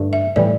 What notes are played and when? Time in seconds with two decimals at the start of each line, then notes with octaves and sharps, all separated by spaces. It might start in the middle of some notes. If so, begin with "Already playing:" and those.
Already playing: G2 D3 A3
0.13 E5
0.36 A2 E3 G3 D5